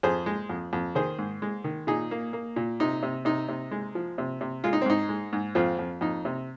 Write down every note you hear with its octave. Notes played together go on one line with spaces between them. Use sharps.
F2 G#4 C5
G#3
F2
F2
D#3 G#4 C5
G#2
G#3
D#3
A#2 D#4 G#4
A#3
A#3
A#2
C3 D#4
C3
C3 D#4
C3
G#3
F3
C3
C3
G#3 F4
D#4
C4
G#2 D#4
G#3
G#2
F2 C4 F4
F2
F2 D#4
C3